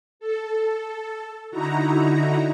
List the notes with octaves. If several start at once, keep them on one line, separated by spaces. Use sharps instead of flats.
A4
D3 D#4 E4 F#4 A#5